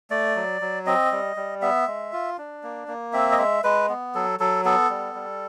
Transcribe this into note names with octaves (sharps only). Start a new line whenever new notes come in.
A3 D5
F#3
F#3
C4 D#5
G3
G3
B3 E5
G#3
F4
D4
A#3
A#3
C4 E5
D#5
G#3 E5
G#3 B4
B3
F#3 A4
F#3 A4
B3 A4
G3
G3